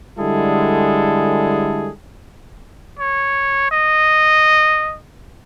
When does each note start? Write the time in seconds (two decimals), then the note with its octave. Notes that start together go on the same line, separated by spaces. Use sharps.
0.19 D3 G3 G#3 E4 G#4 A4
2.99 C#5
3.71 D#5